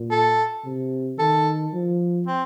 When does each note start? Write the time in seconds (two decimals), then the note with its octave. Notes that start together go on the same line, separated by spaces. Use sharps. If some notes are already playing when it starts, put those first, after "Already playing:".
Already playing: A#2
0.11 A4
0.65 C3
1.19 D#3 A4
1.73 F3
2.27 C4